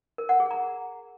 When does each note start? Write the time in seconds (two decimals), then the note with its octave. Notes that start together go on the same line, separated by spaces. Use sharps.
0.18 A#4
0.29 F#5
0.40 G#4
0.51 A#5